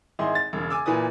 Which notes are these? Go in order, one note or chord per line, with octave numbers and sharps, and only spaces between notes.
G#1 E4 G#4 D#5 C6
A6
E1 C#3
G#5 D6 E6
A#2 E3 B4 G#5 D#6